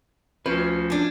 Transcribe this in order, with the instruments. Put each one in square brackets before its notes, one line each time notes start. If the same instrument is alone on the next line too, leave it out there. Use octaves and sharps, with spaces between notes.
[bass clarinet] D2 [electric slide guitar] F3 C#4 [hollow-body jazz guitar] B4
[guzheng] D4 G#5